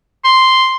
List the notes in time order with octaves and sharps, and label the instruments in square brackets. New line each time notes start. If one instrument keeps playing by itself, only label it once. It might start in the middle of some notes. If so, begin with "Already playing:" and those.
[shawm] C6